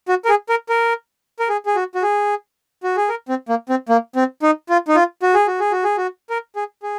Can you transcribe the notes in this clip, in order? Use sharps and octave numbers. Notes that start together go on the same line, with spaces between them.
F#4
A#4
G#4
A#4
A#4
A#4
G#4
G#4
F#4
F#4
G#4
F#4
G#4
A#4
C4
A#3
C4
A#3
C4
D#4
F4
D#4
F4
F#4
G#4
F#4
G#4
F#4
G#4
F#4
A#4
G#4
G#4